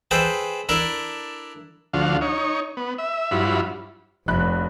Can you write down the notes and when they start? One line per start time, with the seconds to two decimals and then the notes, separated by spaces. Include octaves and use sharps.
0.11 G#4 A4 B4 C5 D#5 G5
0.69 D4 E4 A4 A#4 D5
1.93 D2 D3 F3 F#4 F5
2.21 D#4 C#5
2.77 B3
2.98 E5
3.31 G2 F#3 E4 F4 B5
4.28 F1 A#1 B5 F#6